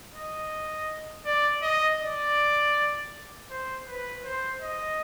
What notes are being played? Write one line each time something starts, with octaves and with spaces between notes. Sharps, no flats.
D#5
D5
D#5
D5
C5
B4
C5
D#5